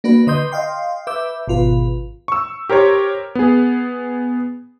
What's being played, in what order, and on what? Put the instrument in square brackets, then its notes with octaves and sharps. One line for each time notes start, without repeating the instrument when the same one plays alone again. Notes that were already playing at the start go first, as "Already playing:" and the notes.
[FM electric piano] A#3 D4 F#4 B4
D3 B4 D#5 C6 D#6 G6
D#5 F5 G5 C6
B4 E5 D6 E6 G6
G#1 B2 F4 B4
[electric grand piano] C#6 E6
G4 A#4 C5 C#5
B3 G#4